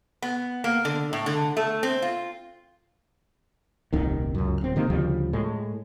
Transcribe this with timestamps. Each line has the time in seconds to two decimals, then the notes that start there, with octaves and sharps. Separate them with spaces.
0.22 B3
0.64 A#3
0.85 D3
1.13 A2
1.26 D3
1.57 A3
1.83 C4
2.02 F4
3.93 D#1 C2 G2 D#3
4.35 C#2 F#2
4.61 D1 C4
4.76 C3 D#3 A#3
4.90 D2 C#3 F3 G3
5.33 A2 G#3